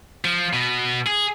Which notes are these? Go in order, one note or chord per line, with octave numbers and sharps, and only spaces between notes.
F3
B2
G#4